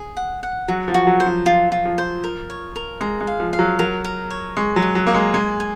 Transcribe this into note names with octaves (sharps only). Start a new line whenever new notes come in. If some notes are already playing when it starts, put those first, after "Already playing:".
Already playing: G#4
F#5
F#5
F#3 F#4
F3
F#4
F#3
C5
F3
F3 F4
F4
F3
C5
A#4
C#5
A#4
G#3 A#5
G#3
F5
F3
F5
F#3
F#3 A#4
A#4
C#5
G#3 C#6
F#3
D#5
F#3
A#3 D#5
G#3
G#3 G#5
G#5